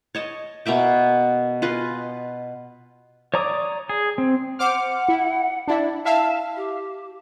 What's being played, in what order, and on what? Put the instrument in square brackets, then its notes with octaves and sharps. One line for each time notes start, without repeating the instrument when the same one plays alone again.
[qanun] C#5 D#5 A5
B2 A#3 E5 G5
F4 G#4 B4 D#5
[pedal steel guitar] C#5 D5 A#5 D6 D#6
G#4
C4
[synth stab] C5 D6 F6 [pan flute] F#5
[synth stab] E4
[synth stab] D4 E4 [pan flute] D5
[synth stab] E4 E5 F5 [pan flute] A5
[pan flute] G4